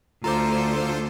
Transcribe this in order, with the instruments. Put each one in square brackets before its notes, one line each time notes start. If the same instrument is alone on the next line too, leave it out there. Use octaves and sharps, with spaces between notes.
[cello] D2 [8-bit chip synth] F4 A4 C5 [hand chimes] A#5 D6